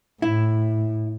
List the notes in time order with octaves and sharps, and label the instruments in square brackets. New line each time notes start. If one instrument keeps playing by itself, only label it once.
[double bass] A2 [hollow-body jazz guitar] E4